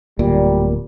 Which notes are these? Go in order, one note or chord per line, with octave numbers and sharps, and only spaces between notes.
D1 A#2 G3